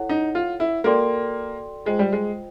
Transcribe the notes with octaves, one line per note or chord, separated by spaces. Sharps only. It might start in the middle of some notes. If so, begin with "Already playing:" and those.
Already playing: E4 A4 C#5 F#5
D#4
F4
E4
A#3 F#4 A4 D5 G5 C6
G#3 F4 G#4 C5 D#5 G5
G3
G#3